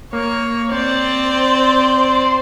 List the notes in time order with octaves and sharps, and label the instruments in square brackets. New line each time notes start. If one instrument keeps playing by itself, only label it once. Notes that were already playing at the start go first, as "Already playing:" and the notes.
[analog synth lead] A#3 [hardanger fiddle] C#5
[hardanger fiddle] C4 D5 [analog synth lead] C5